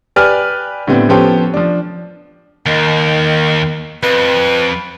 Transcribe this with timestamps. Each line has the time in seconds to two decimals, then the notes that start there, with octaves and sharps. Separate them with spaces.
0.16 G4 B4 D5 G#5 F6
0.87 A2 D3 G3 B3 C4
1.09 F3 B3 C#4 G4 A4 C5
1.54 F3 D4
2.66 D#2 D#3
4.03 F2 B4